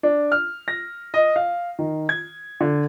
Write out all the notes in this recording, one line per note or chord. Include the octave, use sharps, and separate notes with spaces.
D4
F6
A#6
D#5
F5
D#3
G#6
D3